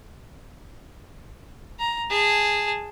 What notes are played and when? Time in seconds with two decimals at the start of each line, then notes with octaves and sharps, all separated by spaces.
1.79 A#5
2.11 G#4 A5